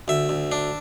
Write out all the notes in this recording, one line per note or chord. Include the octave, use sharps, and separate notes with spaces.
D2 E5
D2
D4